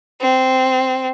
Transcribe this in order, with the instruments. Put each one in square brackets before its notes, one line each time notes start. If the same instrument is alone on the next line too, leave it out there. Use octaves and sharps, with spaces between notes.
[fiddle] C4